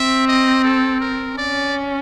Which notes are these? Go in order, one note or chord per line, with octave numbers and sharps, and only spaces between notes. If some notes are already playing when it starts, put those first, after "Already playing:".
Already playing: C4 E5
D#5
A4
A#4
C#4 D5